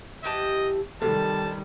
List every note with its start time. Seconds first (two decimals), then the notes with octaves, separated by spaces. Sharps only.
0.24 E3 G4 D#5 A5
1.02 C3 D#3 G3 A4 A5